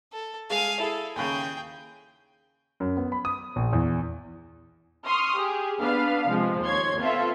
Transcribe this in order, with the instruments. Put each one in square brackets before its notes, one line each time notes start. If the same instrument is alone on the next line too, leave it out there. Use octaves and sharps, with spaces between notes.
[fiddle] A4
[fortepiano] G#3 G#4 [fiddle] F5 G#5
[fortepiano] E4 G#4 [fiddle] A4
[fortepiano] D#2 C#3 [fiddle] G#4 G5
[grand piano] F#2
B3
B5
D#6
A#1
E2
[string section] C6 C#6 D#6 F6
G4 G#4
B3 D4 B4 F5
C3 F3 G#3
D#2 C#5 C6 G#6
B3 C4 F4 A4 E5